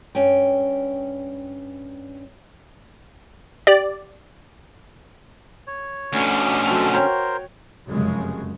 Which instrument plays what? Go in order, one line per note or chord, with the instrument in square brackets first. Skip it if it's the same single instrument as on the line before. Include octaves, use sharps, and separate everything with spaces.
[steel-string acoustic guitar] G2 C#4 G5
[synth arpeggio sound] G4 D5
[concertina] C#5
[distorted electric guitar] D2 B2 [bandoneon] D3 C#4
[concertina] D6 D#6
[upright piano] F#3 F7 [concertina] C4 A4
[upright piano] F#4 C#5 G5 [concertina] A#4 C5
[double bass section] F1 F#2 C#3 G#3